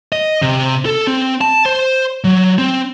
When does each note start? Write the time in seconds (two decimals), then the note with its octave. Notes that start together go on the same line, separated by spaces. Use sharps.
0.12 D#5
0.42 C3
0.86 A4
1.07 C4
1.41 A5
1.66 C5
2.24 F#3
2.58 C4